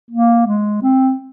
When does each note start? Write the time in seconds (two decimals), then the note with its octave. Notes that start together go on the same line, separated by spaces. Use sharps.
0.11 A#3
0.47 G#3
0.82 C4